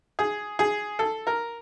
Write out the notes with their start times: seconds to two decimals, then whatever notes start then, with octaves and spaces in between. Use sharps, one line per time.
0.19 G#4
0.59 G#4
0.99 A4
1.27 A#4